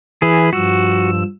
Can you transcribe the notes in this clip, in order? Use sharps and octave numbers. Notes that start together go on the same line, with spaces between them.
E3 G#4 B5
G2 F3 F#4 E6